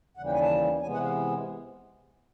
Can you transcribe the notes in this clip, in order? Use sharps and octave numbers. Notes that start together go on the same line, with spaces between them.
D#2 C#3 E3 G3 F#5
G5
G#5
A5
C3 E3 G#3 B3 G#5
F#5
F5